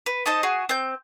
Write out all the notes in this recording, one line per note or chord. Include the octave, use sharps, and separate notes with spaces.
B4
D#4 A4 C5 D#5
F#4 G#4
C4 G6